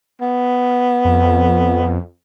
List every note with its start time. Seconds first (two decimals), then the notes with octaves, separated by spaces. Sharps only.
0.21 B3
1.05 F2